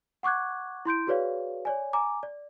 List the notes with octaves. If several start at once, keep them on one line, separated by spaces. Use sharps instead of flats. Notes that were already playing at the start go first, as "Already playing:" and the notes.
F#5 C#6 D6 F#6 G#6
E4 C6 G6 D7
F#4 G#4 B4 C#5 D5 F5
C#5 D5 G#5
G#5 A#5 D6
D5